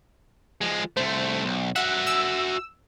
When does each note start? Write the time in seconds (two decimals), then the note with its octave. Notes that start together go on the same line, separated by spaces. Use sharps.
0.61 F3 G#3
0.97 C2 A3 C5
1.45 B1
1.76 F#4 E5 F#5
2.07 E6